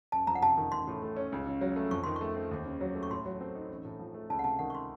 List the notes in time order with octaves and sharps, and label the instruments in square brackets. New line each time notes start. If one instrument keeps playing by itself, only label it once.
[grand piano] F#1 [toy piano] A5
[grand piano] F2 [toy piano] A#5
[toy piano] F#5
[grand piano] C3 [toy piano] A5
[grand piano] D#3
[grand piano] A1 [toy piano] C6
[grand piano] A2
A3
C#4
C#2
C#3
F#3
A3
[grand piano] F2 [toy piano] C#6
[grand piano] D#3 [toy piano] C6
[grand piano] A3 [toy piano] C#6
[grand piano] C4
D#2
C#3
F#3
A3
[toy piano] C#6
[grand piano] A2 [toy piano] C6
[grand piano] F#3
C4
D#4
A1
A2
F3
A3
[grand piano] C#2 [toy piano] A5
[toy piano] F#5
[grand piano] C3 [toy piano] A5
[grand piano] D#3 [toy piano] F#5
[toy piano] C#6
C6